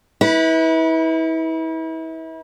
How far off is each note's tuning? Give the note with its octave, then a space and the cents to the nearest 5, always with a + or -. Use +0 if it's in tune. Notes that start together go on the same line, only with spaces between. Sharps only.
E4 -35 B4 -10